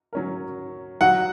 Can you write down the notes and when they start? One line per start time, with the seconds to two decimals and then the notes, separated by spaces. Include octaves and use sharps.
0.13 F#3 C#4 A#4
1.01 F#3 D#4 F#4 F#5